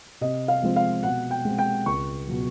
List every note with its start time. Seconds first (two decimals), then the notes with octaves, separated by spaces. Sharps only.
0.21 C3 D#5
0.48 F5
0.62 F3 G#3 C4 F4
0.76 F5
1.03 B2 F#5
1.31 G5
1.45 G#3 C4
1.58 G5
1.86 C#2 C#6
2.27 B2 F#3